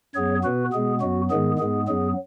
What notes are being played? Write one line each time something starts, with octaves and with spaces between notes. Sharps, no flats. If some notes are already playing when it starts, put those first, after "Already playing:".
F#2 F#3 B3 G#4 C#5
B2 B3 F#4 B4
B2 G#3 B3 G#4
F#2 F#3 B3 F#4
G#2 D#3 G#3 B3 G#4
G#2 G#3 B3 G#4
F#2 F#3 B3 G#4